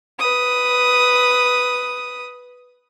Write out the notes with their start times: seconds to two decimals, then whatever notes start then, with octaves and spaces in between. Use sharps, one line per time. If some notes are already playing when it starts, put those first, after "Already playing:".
0.19 B4 D#6